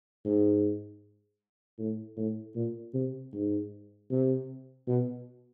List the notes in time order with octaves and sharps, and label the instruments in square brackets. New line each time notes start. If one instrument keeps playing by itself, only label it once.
[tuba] G#2
A2
A2
A#2
C3
G#2
C3
B2